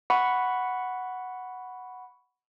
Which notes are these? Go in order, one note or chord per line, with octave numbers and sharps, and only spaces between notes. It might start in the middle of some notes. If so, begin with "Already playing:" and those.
F#5 B5 C#6